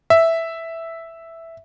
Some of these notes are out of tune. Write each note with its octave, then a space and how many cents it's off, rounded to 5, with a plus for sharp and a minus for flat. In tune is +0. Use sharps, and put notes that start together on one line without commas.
E5 +0